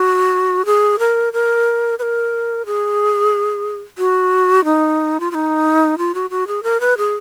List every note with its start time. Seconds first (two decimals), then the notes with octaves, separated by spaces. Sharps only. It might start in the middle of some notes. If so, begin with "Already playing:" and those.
Already playing: F#4
0.65 G#4
0.99 A#4
1.33 A#4
1.99 B4
2.02 A#4
2.66 G#4
3.98 F#4
4.64 D#4
5.20 F4
5.31 F4
5.34 D#4
5.98 F4
6.14 F#4
6.30 F#4
6.47 G#4
6.63 A#4
6.80 B4
6.97 G#4